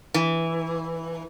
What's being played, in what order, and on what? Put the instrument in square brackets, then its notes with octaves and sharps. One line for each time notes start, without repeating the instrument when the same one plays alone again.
[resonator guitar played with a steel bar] E3